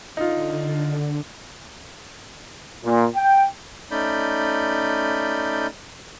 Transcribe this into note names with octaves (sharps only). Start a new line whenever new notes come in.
D3 D#4 F4
A#2
G5
A3 C#4 D#4 D5 B5 G6